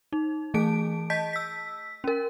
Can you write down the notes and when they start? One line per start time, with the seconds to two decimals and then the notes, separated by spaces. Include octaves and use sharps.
0.13 D#4
0.54 E3 A3 G#4 A5 D7
1.10 D#5 A5 G6 B6
1.33 E6 B6
2.04 C#4 A#4